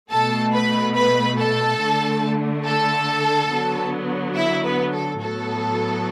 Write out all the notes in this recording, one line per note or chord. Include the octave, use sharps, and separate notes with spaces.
B2 A3 A4 A5
B4 B5
B4 B5
A4 A5
D3 A3
A4 A5
D3 F#3 B3
E4 E5
B3 B4
A4
A2 F#3 B3 A4